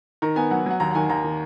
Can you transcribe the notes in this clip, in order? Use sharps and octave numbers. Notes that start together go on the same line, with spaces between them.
D#3 A#5
B3 G#5
F#3 F#5
F#3 F#5
D#2 A#5
F#5
D#3 G#5
D#2 A#5
D#3